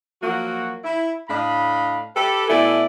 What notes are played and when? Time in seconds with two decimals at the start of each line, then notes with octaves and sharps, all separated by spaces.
0.22 F3 F#3 A#3 F#4
0.84 E4
1.29 A2 D4 D#5 F5 B5
2.16 G4 A4 B4
2.48 B2 A3 E4 A4 D5 G#5